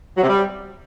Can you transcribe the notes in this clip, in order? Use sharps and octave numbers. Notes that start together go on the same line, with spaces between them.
F#3
C3
G3